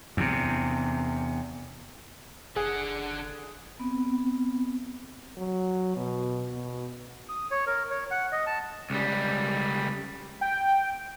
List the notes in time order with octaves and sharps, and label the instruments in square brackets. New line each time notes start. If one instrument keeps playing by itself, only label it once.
[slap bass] E2 C3
[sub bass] F#1 [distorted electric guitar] D3 F#5 [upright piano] G#4
[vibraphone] B3 C4
[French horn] F#3
B2
B2
[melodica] D#6
C#5
A#4
C#5
F#5
D#5
A5
[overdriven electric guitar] C#2 G3
[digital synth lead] G5